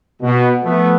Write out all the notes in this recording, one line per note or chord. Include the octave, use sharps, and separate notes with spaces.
B2
F3 A3 B3